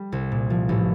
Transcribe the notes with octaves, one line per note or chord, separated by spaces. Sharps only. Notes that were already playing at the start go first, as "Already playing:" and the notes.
Already playing: G3
C2
A#2
F3
A1